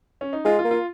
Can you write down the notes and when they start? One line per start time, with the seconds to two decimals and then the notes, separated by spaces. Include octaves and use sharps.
0.21 C#4
0.33 D#4
0.45 G#3 F4
0.59 F4
0.65 A#3
0.71 F4